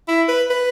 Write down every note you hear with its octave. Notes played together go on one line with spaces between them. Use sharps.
E4
B4
B4